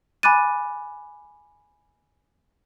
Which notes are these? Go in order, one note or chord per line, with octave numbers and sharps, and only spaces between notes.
G#5 B5 D6 F#6 A6 D#7